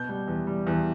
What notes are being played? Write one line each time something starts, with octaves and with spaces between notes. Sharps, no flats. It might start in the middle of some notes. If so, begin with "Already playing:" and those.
Already playing: B2 G6
G3
E2
G3
E2